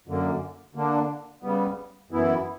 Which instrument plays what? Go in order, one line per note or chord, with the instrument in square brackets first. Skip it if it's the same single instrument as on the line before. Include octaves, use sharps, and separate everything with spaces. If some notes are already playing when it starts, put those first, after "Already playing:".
[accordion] F#2 D3 A#3
D3 A#3 D4
C#3 G3 B3
F#2 E3 B3 E4